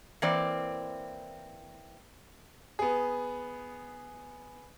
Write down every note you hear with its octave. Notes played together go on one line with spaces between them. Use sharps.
E3 A#3 C4 D5
B3 G#4